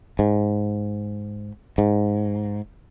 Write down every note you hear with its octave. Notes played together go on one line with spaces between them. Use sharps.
G#2
G#2